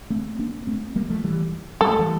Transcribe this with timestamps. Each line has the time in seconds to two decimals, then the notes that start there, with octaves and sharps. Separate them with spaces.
0.10 A3 C4
0.39 A#3 D4
0.67 A3 C4
0.96 G3 A#3
1.10 F3 A3
1.24 E3 G3
1.81 G3 A4
1.91 A3
1.99 E3 G3